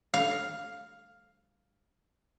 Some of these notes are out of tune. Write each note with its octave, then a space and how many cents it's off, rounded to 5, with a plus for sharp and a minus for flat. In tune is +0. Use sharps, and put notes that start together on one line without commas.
F5 +5